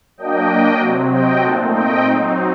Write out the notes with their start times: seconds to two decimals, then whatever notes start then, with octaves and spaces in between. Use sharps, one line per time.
0.18 F#3 A#3 D4 D#5 G5
0.80 C3 F#3 C4
1.11 D#5 G5
1.42 A#2 A3 C4 D#4 F#5 A5
1.73 D#5 G5
2.05 F#3 C4 D#4